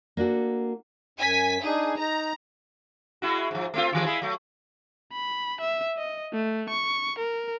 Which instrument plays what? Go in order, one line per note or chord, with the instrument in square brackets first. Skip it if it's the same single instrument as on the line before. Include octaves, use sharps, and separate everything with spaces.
[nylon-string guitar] A#3 D4 F#4 A4
[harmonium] F#2 [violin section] G#5 B6
[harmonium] D4 D#4 [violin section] G#4
[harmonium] D#4 [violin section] A#5
[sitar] G#3 E4 F#4
G#2 F3
A3 C4 F4
D#2 E3 G#3
G#3 E4 G#4
F#3 A3
[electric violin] B5
E5
D#5
A3
C#6
A#4